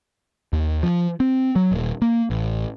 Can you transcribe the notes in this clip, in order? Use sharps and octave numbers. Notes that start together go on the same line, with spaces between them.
D#2
F3
C4
F#3
D#1
A#3
A1